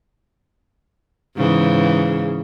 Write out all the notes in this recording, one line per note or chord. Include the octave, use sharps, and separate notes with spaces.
G#2 C#3 E3